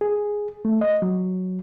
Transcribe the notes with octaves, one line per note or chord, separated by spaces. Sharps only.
G#4
A3
D#5
F#3